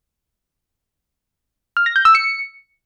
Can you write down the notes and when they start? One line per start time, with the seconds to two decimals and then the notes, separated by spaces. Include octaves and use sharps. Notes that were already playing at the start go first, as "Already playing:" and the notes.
1.77 F6
1.86 A#6
1.96 G6
2.05 E6
2.15 C#7